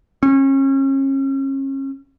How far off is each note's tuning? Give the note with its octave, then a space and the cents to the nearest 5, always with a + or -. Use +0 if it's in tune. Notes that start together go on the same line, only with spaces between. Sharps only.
C#4 -35